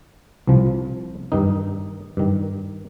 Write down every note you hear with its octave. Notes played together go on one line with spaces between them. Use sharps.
C2 C3 F3
G2 D#3 D#4
G2 D#3